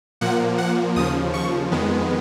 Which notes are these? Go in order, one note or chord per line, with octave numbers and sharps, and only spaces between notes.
A#2 F3 A#3 F#5
F#5
D#2 C#3 F3 D#6
C#6
F2 D#3 G#3 B3